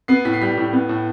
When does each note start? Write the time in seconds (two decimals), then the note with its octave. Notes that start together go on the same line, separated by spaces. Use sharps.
0.08 B3 C7
0.25 A2 B6
0.33 C7
0.41 G3 B6
0.57 A2
0.73 B3
0.89 A2